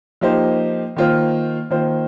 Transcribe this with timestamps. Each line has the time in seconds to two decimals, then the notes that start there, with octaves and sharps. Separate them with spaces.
0.21 F3 A#3 D#4 G4 C5
0.96 D#3 A#3 F4 C5
1.70 D#3 A#3 F4 C5